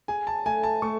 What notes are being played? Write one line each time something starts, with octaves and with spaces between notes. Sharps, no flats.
G#4 G#5
A5
A3 G#5
A5
A3 C#6